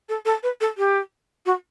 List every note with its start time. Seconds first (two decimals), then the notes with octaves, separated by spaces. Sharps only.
0.09 A4
0.25 A4
0.43 B4
0.61 A4
0.78 G4
1.46 F#4